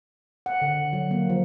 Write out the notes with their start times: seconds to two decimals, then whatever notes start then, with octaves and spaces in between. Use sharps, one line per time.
0.46 F#5
0.62 D3
0.93 F#3
1.11 A#3
1.29 F3